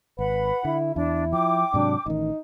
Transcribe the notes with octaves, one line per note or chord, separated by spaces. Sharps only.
G#1 B4 F#5 B5
D3 E4
E2 D4 E4
F3 G5 D6
G#2 C3 F#3 D4
A1 D#3 D#4